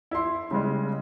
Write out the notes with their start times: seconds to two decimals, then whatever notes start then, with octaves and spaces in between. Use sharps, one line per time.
0.11 E4 C6
0.51 C#3 G3 G#3